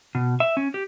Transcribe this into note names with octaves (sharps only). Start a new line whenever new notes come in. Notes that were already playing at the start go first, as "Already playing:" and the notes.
B2
E5
C#4
G4